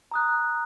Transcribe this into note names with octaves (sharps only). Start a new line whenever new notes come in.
A#5 D#6 F#6